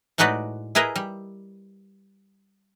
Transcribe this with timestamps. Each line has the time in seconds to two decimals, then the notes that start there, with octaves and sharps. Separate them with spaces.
0.18 A2 G#3 D#4 F#4 B4 D5
0.75 E4 G#4 A#4 B4 D#5
0.96 G3